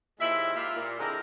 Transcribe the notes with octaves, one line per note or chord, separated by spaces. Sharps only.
D#2 A#2 G#3 E4 C5 E5
E4 F4 G4 A#4 E5
A#2
D3 G#3 C4 E4 A#4